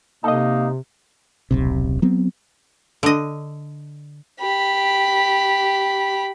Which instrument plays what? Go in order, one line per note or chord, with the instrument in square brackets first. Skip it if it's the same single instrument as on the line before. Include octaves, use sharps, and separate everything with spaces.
[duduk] C3 [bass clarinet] A#3 [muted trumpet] D#4 [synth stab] A4 D#5
[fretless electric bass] D#1 B1 C3
F#3 B3 C4
[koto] D3 D#5
[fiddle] G4 B5